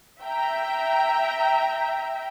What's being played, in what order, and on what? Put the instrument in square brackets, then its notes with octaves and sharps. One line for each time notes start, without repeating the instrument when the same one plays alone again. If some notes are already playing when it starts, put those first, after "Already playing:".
[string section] E5 G5 A#5